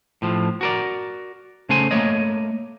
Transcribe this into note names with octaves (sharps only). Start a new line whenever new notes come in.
A2 F3
F#4 A#4 D5
C#3 A3 C5 G#5
A3 A#3 C#5 D#5